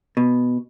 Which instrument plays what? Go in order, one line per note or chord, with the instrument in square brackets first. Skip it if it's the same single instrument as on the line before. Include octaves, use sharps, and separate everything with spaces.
[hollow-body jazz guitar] B2